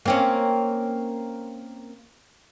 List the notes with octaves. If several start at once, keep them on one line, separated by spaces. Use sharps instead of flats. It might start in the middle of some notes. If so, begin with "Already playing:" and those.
A#3 C4 C#4